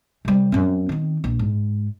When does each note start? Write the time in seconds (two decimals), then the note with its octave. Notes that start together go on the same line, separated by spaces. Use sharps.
0.25 C3 G3
0.52 F#2 C4
0.89 D#3 C4
1.24 A#1
1.39 G#2